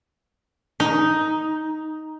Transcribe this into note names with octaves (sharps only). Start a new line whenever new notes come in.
D#4